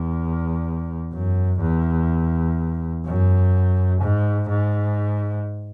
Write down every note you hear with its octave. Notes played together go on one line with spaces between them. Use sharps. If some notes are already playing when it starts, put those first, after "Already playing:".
Already playing: E2
F#2
E2
F#2
G#2
G#2